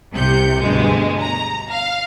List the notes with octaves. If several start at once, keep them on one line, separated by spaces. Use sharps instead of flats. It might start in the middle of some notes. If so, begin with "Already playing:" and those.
C2 C3 G6 C#7
D2 G2 B2 G#3
A#5
F5